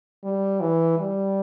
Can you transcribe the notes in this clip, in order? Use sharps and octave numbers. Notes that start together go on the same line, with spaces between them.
G3
E3
G3